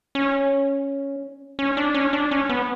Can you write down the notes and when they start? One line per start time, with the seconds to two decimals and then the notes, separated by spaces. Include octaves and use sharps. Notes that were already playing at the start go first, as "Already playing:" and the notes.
0.15 C#4
1.59 C#4
1.77 D4
1.94 C#4
2.13 D4
2.31 C#4
2.49 B3